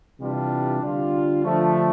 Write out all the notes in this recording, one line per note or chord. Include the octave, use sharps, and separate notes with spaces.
C3 E3 G3 D4 F4
D3 G3 D4 F4
D3 F3 A3